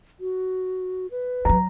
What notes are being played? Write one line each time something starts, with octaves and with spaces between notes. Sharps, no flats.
F#4
B4
F#3 C#4 A#5